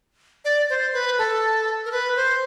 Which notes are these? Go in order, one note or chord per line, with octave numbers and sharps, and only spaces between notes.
D5
C5
B4
A4
A#4
B4
C5